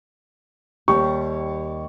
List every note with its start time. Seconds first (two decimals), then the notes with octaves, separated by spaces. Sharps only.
0.88 D#2 G3 G4 C#6